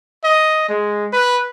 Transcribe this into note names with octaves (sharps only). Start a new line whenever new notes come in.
D#5
G#3
B4